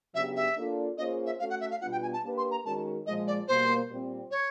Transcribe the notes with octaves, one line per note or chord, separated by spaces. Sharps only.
C#3 F#3 B3 D4 G4 E5
E5
A#3 D4 F4 A4 D5
A#3 C#4 F4 G#4 C5 D#5
E5
A3 C#4 F#4 A4 F5
F#5
E5
F5
B2 G3 B3 D4 F4 F#5
G5
G#5
A5
A#3 D4 G4 B4
C6
A#5
D#3 G#3 C#4 F#4 A#4 A5
A#2 F3 G#3 D#5
D5
B2 G3 A#3 C5
A#2 G3 C4
C#5